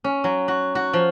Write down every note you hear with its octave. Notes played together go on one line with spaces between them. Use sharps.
C#4
F#3
F#4
F#4
F3